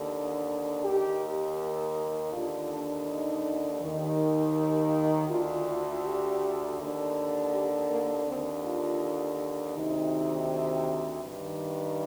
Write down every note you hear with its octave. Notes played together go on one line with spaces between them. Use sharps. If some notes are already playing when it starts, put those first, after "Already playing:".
Already playing: D#2 D3
D#2 D#3 G4
D#2 D3 F4
D4
D#4
D#2 D#3
D2 D3 F4
F4
G4
D#2 D3
G4
A#3
D#2 D3 C4
F4
D2 C3 D#3 D#4
G2 D#3